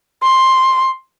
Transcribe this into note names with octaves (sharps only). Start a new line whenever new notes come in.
C6